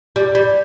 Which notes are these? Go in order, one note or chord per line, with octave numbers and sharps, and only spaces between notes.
G3
G3